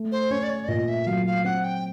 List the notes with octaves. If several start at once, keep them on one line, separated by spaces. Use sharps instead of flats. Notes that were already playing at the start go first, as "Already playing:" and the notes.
Already playing: A3
C5
C#4 C#5
D5
C#5
D5
A#2 D#5
E5
F#3 F5
F5
C4 F#5
G5